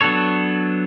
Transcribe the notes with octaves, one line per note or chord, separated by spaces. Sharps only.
F#3 B3 D4 A4 C#5